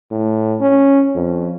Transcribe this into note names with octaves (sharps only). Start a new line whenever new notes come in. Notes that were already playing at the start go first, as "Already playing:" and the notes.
A2
C#4
F2